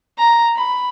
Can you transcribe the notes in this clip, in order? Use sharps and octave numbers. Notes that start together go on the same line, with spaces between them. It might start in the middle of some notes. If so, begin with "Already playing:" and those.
A#5
B5